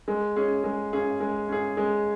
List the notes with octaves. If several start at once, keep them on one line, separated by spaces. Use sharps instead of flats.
G#3
C#4 G#4
G#3
C#4 G#4
G#3
C#4 G#4
G#3